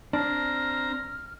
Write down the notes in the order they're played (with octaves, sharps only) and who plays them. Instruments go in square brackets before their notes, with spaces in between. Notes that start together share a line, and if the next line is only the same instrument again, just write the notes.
[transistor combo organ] C4 A#5 [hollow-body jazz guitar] D4 [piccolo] F6